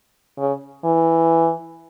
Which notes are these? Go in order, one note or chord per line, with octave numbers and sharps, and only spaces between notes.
C#3
E3